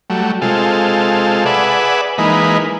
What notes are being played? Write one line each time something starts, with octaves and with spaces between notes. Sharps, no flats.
F#3 G3 A3
C3 G#3 F4 A4
G#4 B4 D5 E5 F#5
E3 G#3 A#3 D#4 B4